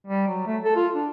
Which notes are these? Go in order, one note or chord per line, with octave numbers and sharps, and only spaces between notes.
G3
F#3
A3
A4
F4
D4